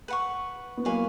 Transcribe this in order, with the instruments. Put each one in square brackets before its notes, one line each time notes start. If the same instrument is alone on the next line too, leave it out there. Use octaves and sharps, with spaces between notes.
[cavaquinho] B4 F#5 C#6
[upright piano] B3
[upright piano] F#3 A#3 [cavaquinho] B4 F5 G#5 C#6